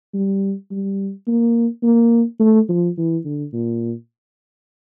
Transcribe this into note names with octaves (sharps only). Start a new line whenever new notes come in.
G3
G3
A#3
A#3
A3
F3
E3
D3
A#2